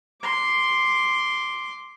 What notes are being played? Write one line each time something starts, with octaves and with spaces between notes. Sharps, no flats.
C6 D6